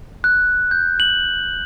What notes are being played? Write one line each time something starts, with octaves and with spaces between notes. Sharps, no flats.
F#6
G6
F#7